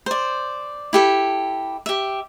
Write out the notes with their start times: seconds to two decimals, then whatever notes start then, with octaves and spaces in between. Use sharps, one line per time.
0.06 C5 D5
0.93 E4 G4 A4
1.86 G4 E5